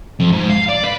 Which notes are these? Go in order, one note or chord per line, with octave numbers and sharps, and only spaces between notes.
F2
G#2
F5
D5
B4